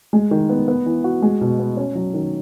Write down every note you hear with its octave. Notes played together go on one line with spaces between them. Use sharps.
G#3
D#3
B3
B3
E3
F#4
G#3
B2
B3
C#4
F#3
D#3